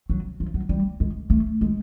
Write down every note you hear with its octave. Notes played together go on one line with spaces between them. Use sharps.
F#3
F3
F#3
G3
G#3
A3
G#3